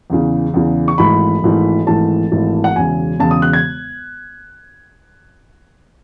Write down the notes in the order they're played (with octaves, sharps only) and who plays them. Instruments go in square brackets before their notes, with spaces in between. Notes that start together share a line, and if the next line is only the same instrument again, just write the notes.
[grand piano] E2 C#3 E3
E2 C#3 E3
C#6
G#1 G#2 E3 A3 B5
G#1 G#2 E3 A3
G#1 G#2 E3 A3 A5
G#1 G#2 E3 A3
F#5
E1 E2 C#3 G#5
E1 E2 C#3 A5
D#6
F#6
G#6